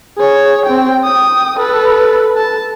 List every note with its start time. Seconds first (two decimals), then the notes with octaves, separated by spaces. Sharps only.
0.18 G#4 C#5
0.66 C4 G5
1.05 G5 D#6
1.58 A4 B4
2.37 A5